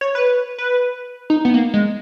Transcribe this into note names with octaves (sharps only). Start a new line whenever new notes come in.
C#5
B4
B4
D#4
B3
A#3
G#3